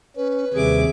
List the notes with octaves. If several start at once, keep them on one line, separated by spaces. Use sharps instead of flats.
C#4 B4
D#2 C3 G3 G#4 E5 D6